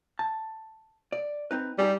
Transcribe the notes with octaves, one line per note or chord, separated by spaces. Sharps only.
A5
D5
C4 D#4 B4
G3 D#4 G4 G#4